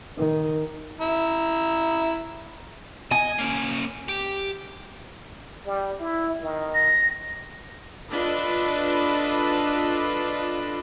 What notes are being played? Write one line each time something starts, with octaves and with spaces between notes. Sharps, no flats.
D#3
E4 A#5
D#5 G#5
A#3 C#4
G4
G3
E4
D#3
A#6
D4 F4 A4 B4 D#5